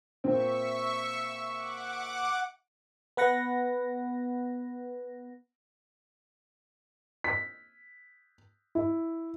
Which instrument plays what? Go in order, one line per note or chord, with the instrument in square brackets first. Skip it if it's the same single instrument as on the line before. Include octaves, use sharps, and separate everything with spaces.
[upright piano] A#2 C4 [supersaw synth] E5 C#6
[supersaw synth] F#5 D6
[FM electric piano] B3 B4 F#5 A#6
[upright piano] B6
E4